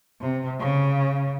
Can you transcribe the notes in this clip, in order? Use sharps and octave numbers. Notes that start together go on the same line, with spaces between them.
C3
C#3